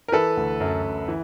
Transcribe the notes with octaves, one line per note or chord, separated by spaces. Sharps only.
A#4
E3 A4 B4
D2
F#2
F#2
E3